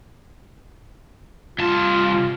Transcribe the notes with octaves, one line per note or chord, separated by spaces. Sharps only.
C2 F4 A5